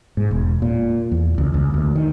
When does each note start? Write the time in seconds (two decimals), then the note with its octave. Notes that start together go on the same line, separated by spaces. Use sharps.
0.17 G#2
0.31 E1
0.62 A#2
1.12 E2
1.38 C#2
1.54 C#2
1.74 D2
1.96 D#3